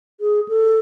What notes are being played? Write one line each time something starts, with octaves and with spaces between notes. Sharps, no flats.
G#4
A4